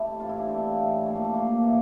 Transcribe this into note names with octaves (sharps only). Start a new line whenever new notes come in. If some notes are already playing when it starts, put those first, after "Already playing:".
Already playing: A3 C4 E4 G4
A2 E3 F4
E4
D4
A2 E3 C4
A2 E3
A#2 F3 A3
A#3
A3
A#2 F3 A#3
A2 E3